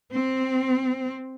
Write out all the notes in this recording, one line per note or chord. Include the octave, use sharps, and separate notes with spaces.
C4